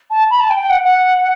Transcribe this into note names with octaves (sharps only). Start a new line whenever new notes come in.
A5
B5
A5
G5
G5
F#5
F#5